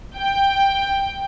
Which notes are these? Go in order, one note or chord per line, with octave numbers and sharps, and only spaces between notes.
G5